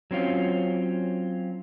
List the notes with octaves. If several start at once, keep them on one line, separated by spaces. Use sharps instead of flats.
F#3 C4 C#4 F4